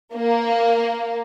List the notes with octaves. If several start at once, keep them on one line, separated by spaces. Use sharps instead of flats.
A#3